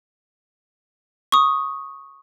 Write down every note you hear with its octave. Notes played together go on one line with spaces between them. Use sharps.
C#6 D#6